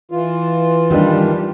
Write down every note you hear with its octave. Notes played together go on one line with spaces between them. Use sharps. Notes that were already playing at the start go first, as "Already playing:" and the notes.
E3 F4
D#3 G3 D4